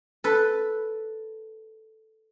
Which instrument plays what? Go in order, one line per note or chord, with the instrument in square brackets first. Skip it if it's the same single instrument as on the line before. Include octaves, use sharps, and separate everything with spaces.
[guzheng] A4 B4